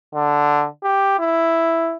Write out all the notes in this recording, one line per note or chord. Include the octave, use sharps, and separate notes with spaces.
D3
G4
E4